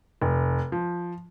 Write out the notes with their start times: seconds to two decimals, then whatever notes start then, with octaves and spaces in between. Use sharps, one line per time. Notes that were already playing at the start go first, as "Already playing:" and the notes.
0.22 F1
0.72 F3